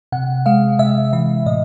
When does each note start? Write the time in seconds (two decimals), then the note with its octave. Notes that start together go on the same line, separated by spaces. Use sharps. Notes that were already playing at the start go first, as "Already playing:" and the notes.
0.12 C3 F#5
0.46 G#3 F5
0.79 C3 E5
1.13 E3 E5
1.46 A2 D#5